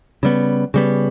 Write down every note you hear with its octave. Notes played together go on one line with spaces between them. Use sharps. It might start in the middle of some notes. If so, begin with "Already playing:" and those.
C#3 G3 B3
C#3 G3 B3